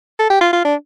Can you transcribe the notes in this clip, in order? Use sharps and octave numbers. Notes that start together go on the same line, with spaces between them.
A4
G4
F4
F4
D4